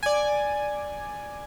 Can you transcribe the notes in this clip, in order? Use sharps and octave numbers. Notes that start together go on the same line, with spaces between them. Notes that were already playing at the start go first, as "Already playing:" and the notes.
D5 G#5